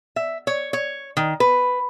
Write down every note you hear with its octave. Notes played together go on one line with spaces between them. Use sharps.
E5
C#5
C#5
D#3
B4